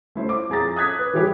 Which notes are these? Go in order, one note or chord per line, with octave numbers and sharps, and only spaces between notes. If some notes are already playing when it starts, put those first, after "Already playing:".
A3 E4 C5
D6
F2 G#4 A#5 A6
D#6 F#6 G#6 B6
B4
E3 G3 E4 G4 G#4